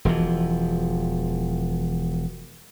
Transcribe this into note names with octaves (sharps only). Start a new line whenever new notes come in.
E1 E3 F3